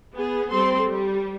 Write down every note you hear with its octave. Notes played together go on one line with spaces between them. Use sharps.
B3 G#4
G3 C4 A4 C6
G3